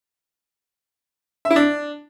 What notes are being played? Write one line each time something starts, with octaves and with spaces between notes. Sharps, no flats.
E5
E4
D4